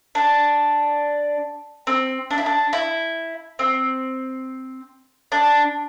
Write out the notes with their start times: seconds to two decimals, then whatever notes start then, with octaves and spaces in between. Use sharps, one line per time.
0.15 D4
1.87 C4
2.31 D4
2.38 E4
2.46 D4
2.73 E4
3.59 C4
5.32 D4